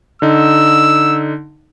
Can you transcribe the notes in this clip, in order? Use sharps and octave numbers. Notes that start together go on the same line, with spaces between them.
D3 D#4 E6